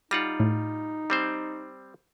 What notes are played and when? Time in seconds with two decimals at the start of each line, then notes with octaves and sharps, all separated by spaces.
0.11 G3 D#4 F4 F#5 A#6
0.40 A2
1.10 G3 C4 C5